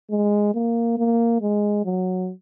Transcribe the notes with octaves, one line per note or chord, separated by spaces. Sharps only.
G#3
A#3
A#3
G#3
F#3